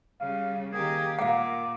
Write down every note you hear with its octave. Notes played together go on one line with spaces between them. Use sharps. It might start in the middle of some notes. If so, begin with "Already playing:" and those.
C#3 G3 F5
D#3 A#3 G4 G#4
A#2 F5 F#5 D6